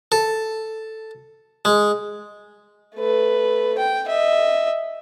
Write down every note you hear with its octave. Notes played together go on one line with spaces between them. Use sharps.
A4
G#3
A3 B4
G5
D#5 E5